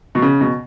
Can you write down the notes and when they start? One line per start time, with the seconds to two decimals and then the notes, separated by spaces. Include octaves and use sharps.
0.15 B2
0.22 C#3
0.41 B2